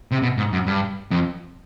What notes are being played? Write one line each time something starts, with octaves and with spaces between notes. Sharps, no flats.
C3
B2
G#2
F#2
G2
F2